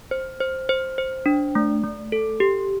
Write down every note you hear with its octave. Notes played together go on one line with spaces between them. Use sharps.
C5
C5
C5
C5
D4
A3
A3
A4
G4